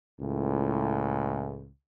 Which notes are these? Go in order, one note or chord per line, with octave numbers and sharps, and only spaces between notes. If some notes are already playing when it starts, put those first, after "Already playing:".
C#2 A2